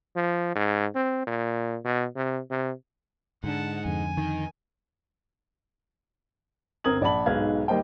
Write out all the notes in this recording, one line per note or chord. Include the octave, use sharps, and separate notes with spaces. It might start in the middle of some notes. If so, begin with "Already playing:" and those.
F3
G#2
C4
A#2
B2
C3
C3
G#2 D3 D4 F#5 A5
F2 D3 G#5
D#3
G1 C4 A#4 D#6 G#6 F#7
A#1 D5 F#5 A5 B5 F#7
B1 G#2 G#3 B4 F5 G#6
D#2 G3 A#3 C5 D#5 G5